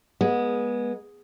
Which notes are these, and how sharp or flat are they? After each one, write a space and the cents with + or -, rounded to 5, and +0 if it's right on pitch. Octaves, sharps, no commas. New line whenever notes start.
G#3 +0 B3 -25